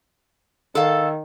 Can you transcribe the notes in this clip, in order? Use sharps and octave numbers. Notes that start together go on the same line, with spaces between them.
D#3 A4 F5